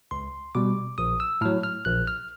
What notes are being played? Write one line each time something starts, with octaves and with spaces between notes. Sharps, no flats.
C#2 C6
B2 G3 D6
A#1 D#6
E6
A2 F#3 F6
F6
A#1 F#6
F6